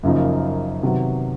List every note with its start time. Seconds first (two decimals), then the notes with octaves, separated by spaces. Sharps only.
0.03 F#2 C#3 F3 A#3 D#4
0.83 C3 D#3 F#3 B3